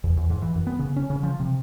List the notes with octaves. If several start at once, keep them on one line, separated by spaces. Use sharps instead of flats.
E2
E2
G#2
E3
F#2
B3
C#3
C#4
C#3
F3
C3